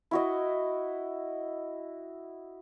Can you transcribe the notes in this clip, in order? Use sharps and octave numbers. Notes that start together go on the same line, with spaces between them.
E4 F#4 D#5